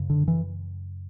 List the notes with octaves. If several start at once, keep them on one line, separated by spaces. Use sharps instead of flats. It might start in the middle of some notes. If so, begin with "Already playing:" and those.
Already playing: F#2 C#3
D3
E3